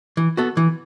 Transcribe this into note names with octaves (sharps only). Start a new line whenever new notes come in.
E3
B3 F#4 A4
E3